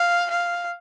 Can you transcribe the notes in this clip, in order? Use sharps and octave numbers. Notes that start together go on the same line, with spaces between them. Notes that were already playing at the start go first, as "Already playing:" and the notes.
Already playing: F5
F5